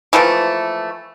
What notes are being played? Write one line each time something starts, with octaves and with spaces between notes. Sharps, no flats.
E3 F3 A3 A#3